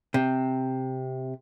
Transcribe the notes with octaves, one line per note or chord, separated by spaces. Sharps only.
C3